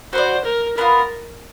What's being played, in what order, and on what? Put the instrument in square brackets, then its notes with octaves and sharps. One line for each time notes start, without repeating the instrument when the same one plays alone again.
[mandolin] F#4 B4 D5 [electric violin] C5
[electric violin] A#4
[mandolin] B3 D4 F4 [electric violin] A#4